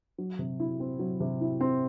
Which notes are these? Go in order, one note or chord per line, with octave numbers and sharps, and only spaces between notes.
F#3
C3
E4
C4
F#3
C3
E4
C4